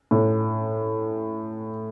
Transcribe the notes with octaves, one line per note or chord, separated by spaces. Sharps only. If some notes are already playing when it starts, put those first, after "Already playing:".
A2